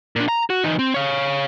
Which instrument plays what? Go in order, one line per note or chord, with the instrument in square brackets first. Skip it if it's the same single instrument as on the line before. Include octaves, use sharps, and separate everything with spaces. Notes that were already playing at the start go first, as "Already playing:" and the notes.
[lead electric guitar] A#2 D4
A#5
F#4
E3 D#4
C4
C#5 F5